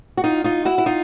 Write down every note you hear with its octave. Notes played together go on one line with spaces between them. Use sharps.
F#4
D#4 F4
D#4 F4
E4 F#4
E4
D#4 F4